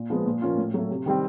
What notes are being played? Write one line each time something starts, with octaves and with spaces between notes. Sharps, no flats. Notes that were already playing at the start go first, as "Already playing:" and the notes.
Already playing: A#2
F3 G#3 B3
A#2
F3 A#3 C#4 F4
A2
F#3 A3
C3
D#3 G3 C4